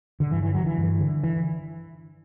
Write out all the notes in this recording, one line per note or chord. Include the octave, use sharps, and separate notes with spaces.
D3
G2 E3
E3
D3 F#3
E3
G2
D3
E3